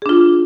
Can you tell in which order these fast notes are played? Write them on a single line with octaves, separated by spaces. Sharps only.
G#4 D4 F4